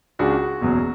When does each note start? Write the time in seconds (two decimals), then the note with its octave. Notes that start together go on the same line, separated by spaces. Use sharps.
0.19 C#2 C#3 G#3 D4 F#4
0.61 F#1 E2 B2 F#3